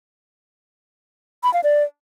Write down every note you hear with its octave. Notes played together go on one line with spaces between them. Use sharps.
B5
F5
D5